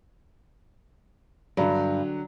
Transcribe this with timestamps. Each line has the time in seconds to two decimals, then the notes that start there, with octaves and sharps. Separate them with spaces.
1.57 G2 D3 F#3